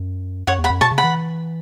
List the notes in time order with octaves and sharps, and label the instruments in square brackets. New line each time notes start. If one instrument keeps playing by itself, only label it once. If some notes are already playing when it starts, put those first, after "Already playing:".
Already playing: [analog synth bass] F#2
[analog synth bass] F#2 [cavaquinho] C#5 F#5
[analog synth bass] E2
[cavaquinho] F#5 B5
[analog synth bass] F#2
[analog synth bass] B2 [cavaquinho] A5 C#6
[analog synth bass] C#3
[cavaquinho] F#5 B5
[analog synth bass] E3